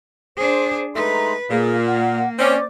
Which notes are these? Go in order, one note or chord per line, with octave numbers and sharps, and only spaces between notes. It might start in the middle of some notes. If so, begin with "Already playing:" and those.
D4 G#4 C5
G#3 A3 D#4 B4 A#5 C6
A#2 A#3 G#4 F5
F#5
C4 C#4 C5 D5 D6